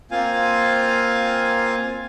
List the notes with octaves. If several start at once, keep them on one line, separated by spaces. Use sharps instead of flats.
A#3 C4 F4 F5 G#5